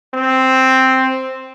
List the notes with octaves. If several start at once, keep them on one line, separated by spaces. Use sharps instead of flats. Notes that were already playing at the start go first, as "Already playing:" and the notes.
C4